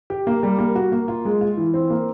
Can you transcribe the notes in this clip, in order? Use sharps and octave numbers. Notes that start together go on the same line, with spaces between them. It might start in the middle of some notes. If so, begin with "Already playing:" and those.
G4
A#3
G3
A#3
F#4
A#3
F4
G#3
F4
E3
C4
A#3